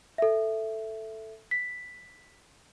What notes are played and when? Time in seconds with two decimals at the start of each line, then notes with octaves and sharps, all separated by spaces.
0.18 A4 E5
1.51 B6